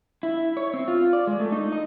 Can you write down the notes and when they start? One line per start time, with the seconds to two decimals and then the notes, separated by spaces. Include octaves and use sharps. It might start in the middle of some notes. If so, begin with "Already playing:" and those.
0.23 E4
0.57 C#5
0.74 C4
0.88 F4
1.13 D5
1.27 G#3
1.40 A3
1.52 D#4
1.72 D#5